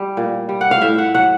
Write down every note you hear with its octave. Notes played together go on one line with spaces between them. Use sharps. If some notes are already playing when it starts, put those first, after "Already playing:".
Already playing: G3
A#2
G3
F#5
F5
A2 E5
F#5
F#3 F#5